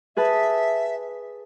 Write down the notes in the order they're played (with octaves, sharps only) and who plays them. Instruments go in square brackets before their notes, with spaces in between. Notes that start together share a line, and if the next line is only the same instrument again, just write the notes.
[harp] G#4 B4 A5 [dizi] E5